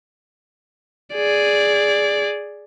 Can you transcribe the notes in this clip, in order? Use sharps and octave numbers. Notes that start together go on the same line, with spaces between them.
G#4 D5